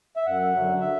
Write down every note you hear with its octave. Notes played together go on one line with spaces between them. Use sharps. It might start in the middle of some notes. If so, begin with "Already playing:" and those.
E5
F#2 F#5
D3 F#3
E5